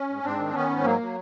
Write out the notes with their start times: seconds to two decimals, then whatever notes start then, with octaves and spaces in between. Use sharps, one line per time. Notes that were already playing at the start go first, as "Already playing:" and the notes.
Already playing: C#4
0.09 G#2
0.23 G#2 C4 D4
0.39 D#3
0.54 D#3 B3 C#4
0.69 G#2
0.84 F#3 A#3
1.01 F#3